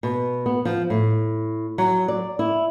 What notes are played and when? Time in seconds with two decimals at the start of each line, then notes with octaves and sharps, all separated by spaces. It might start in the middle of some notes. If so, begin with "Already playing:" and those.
0.03 B2
0.46 B3
0.65 F3
0.90 A2
1.78 F#3
2.08 D5
2.39 E4